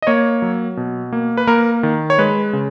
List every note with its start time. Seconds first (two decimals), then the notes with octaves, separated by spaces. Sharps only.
0.02 D#5
0.07 A#3 C#5
0.42 F#3
0.77 B2
1.13 A#3
1.37 B4
1.47 A#3 A#4
1.83 D#3
2.10 C#5
2.19 G#3 B4
2.53 C#3